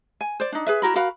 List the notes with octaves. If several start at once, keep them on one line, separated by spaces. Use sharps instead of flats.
G#5
C5 D5
D4 D#4
G#4 B4 E5
E4 F#4 A#4 B5
F#4 A#4 F5 B5